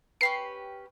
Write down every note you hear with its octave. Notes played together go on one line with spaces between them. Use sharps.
C#4 G4 B4 C7